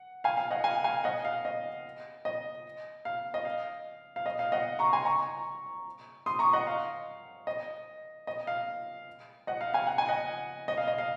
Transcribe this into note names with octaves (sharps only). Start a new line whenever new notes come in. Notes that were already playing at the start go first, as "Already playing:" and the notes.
Already playing: F#5
F5 G#5
F5
D#5 F#5
F5 G#5
F5 G#5
D#5 F#5
F5
D#5
D#5
F5
D#5
F5
F5
D#5
F5
D#5 F#5
A#5 C#6
G#5 C6
A#5 C#6
C6 D#6
A#5 C#6
D#5 F#5
F5
D#5
D#5
F5
D#5 F#5
F5
F5 G#5
F#5
G#5
D#5 F#5
D#5
F5
D#5
F5